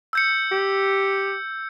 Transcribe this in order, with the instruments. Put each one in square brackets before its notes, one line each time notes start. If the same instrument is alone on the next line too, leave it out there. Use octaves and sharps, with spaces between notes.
[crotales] E6 G6 C#7
[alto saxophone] G4